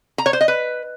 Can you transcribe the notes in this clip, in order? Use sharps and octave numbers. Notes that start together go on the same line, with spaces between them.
A#5
C#5
C5
D#5
B4